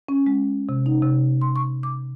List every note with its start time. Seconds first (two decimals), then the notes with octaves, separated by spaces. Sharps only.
0.08 C#4
0.27 G#3
0.69 C3
0.86 D#4
1.03 C3
1.42 C6
1.56 C#6
1.83 D6